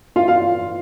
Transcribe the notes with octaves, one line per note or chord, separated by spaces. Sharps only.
F4 F5
F4 F5